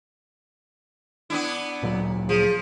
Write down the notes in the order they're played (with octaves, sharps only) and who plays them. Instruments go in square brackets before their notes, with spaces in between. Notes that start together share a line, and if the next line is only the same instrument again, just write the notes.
[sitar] B3 D4 E4
[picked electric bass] D1 A#2 F#3
[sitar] F3 [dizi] G#4